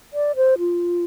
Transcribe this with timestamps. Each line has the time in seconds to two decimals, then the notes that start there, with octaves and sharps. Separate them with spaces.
0.13 D5
0.36 C5
0.59 F4